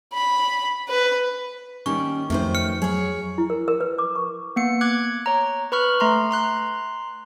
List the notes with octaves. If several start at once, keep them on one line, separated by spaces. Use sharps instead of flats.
B5
B4
D#3 G3 A#3 C#4 C#6
F2 D#3 F#3 A3 C5
F6 C#7
F#3 G#4 C#5
E4
A#4
A#4
B4
D6
C#6
A#3 B3 C#7
D6 F#6 G#6
C#5 A#5
B4 B5 C#6 F6
A3 A#5 C6
A#5 C6 F#6